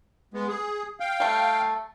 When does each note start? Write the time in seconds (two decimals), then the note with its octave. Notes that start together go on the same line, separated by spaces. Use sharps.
0.34 G#3 B3
0.48 G#4
1.00 F5 G5
1.20 G3 A3